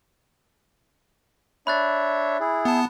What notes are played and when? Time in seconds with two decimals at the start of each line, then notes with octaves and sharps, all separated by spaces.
1.67 D4 C#5 E5 B5 F#6 A6
2.40 E4 G#4
2.65 B3 A5